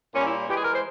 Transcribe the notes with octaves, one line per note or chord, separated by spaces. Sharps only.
A#2 G3 A#3 C#4
E4
E3 G#3 G4
G#4
A#4
C5